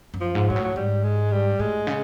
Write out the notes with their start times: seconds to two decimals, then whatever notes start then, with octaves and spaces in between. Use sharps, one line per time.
0.14 F#2
0.21 F3
0.35 G#2
0.49 G#2 F#3
0.56 A2
0.64 F#3
0.76 G#2 G3
1.04 G#3
1.32 G3
1.59 A2 G#3
1.87 C#3